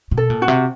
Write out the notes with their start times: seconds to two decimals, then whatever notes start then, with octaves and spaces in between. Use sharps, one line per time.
0.11 B2
0.17 A4
0.30 A#2
0.42 F#4
0.48 C3